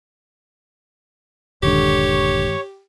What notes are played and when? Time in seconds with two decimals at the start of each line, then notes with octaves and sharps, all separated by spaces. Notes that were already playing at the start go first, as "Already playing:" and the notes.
1.63 D#1 G2 D3 D#3 G#3 G4 C#5 C#6